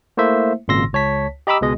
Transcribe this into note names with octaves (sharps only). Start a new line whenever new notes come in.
A3 A#3 E4 C5 E5
G#1 A#2 C#3 C6 E6 A#6
C#2 C#5 A5 B6
G4 D#5 A#5 B5 D6 E6
C#2 B2 G#3 D#5